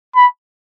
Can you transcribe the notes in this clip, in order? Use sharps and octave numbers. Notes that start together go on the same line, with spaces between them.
B5